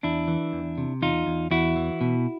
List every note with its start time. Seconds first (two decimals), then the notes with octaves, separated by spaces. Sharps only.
0.03 E2 D4 E4
0.28 E3
0.53 E2
0.78 C3
1.02 E2 D#4 F4
1.27 E2
1.51 E2 E4 F#4
1.76 E3
2.01 B2